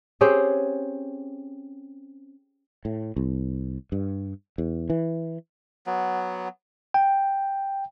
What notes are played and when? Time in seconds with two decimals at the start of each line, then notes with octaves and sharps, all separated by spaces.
0.21 C4 C#4 G4 G#4
2.85 A2
3.16 C2
3.92 G2
4.58 E2
4.90 E3
5.86 F#3 B3
6.94 G5